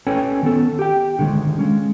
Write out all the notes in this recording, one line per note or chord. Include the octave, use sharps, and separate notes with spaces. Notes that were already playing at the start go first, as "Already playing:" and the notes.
C#4 A4 B4 C#5 G5 G#5
D#3 B3 A4
G4 G5
D3 D#3 G#3
G#3 C#4